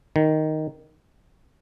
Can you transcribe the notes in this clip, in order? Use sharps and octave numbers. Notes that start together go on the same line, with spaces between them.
D#3